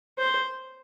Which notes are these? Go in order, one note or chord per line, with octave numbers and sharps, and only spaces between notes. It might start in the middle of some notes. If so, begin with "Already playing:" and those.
C5